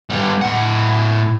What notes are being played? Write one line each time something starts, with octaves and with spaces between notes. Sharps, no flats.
G3 B3
A2 F#5